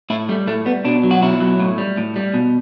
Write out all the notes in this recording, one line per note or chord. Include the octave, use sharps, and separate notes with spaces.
A2 E4
G3 A3
A2 A3
G3 B3
B2 D4
F#3
F#4
B2 E4
F#3
A2
G3
A2
G3
B2